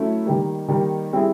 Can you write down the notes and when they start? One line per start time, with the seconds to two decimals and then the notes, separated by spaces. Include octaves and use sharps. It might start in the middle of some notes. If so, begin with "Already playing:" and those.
Already playing: F#3 A3 C#4 E4
0.26 D#3 G3 A#3
0.68 D#3 G3 A#3
1.13 G3 C4 E4 G#4